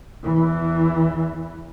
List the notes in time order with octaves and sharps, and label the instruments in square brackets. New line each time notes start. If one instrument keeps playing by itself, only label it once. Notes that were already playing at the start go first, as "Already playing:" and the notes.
[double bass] E2 E3